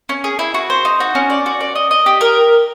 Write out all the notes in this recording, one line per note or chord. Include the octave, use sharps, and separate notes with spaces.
C#4
G#4
E4
F#4
C5
D#4
F#4
C#4
D5
F#4
D5
D#5
D#5
G4
A#4